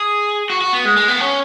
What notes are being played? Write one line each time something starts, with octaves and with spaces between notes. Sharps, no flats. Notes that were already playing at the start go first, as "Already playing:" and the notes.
Already playing: G#4
F#4
F#4
B3
G#3
G#3
B3
C#4